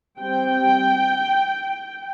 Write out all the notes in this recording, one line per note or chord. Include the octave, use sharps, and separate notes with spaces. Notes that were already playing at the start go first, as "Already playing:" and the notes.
G3 C4 G5